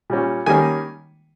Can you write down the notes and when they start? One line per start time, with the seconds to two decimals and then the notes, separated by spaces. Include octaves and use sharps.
0.10 A#2 G3 C#4
0.46 D#3 G3 A#3 C#4 G#5